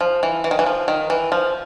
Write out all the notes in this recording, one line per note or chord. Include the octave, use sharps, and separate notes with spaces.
F3
E3
E3
D#3
E3
F3
D#3
E3
F3